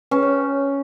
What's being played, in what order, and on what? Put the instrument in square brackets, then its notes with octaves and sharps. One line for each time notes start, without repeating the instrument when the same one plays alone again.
[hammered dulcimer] C#4 [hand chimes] B4
[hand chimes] C#5